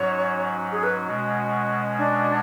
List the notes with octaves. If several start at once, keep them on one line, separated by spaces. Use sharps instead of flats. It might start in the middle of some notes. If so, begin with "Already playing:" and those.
Already playing: G#2 F#3 C#4 F#4 C#5
G#4
B4
B2 G#3 C#4 F#4
D4